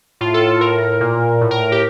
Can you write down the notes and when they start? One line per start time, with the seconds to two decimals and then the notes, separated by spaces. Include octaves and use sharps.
0.21 A2 F4
0.34 A4
0.47 A4
0.61 A2 A#4
1.00 A#2
1.41 A2
1.51 A#4
1.72 G4